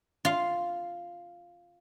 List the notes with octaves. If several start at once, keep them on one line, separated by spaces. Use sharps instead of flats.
F4 F5